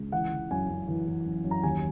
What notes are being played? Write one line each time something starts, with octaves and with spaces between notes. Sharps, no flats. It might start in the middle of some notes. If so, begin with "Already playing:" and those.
Already playing: C#2
E3 F#5
E3
F#2 G#5
F#2
E3
E3
F#2
F#2
A#5
D#2 G#5